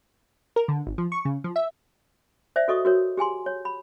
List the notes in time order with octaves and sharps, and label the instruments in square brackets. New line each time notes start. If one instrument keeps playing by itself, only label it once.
[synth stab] A#4
D3
G#1
F3
C#6
C#3
F3
E5
[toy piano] C5 D5 E5
F#4 A4 D#5 C#6 D#6
F#4 A#4 C#5
G4 G#4 G#5 C6
C#5
B5